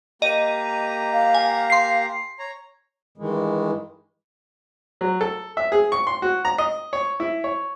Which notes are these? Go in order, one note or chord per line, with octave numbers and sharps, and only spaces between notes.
A#3 G4 D#5 A#5 D#7
F5
G#5
C6 C7
C#5 A#5
G2 D#3 E3 G#3
F#3
A4
E5
G#4
C#6
C6
F#4
A#5
D#5
C#5
E4
C#5